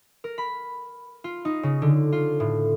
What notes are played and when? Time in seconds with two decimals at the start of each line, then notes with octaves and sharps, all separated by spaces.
0.24 A#4
0.38 B5
1.24 F4
1.45 D#4
1.63 C#3
1.82 D3
2.12 F4
2.40 A2